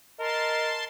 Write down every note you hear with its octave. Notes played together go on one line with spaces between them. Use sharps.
A#4 D#5 A5 C6